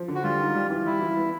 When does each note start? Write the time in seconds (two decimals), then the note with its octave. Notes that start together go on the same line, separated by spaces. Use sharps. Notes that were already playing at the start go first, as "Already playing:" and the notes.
Already playing: F3
0.08 D3
0.15 F#4
0.24 G3 F4
0.40 D#3
0.55 G3
0.70 E3
0.86 G3 E4
1.01 E3
1.17 B3